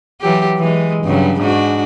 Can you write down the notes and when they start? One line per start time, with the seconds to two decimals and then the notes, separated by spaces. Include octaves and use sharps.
0.21 E3 F#3 G4
0.57 E3 G#3
1.04 G2 C#3 F#3
1.41 G#2 D4 F#4